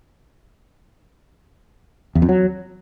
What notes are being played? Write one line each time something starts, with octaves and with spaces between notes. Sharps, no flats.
E2
F2
F#3